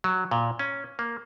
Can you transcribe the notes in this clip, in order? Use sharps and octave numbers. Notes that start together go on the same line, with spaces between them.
F#3
A#2
C#4
A#3